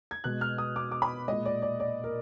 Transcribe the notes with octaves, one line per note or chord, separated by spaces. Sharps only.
G#6
B2 G#3 F#6
F6
D#6
D6
D6
B5
A#2 G#3 D#5
D5
D5
D5
A#4